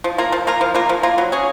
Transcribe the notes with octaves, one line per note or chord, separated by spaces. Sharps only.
F3
A#3 F4 A#4
F3
A#3 F4 A#4
F3
A#3 F4 A#4
F3
A#3 F4 A#4
F#3
C#4 G#4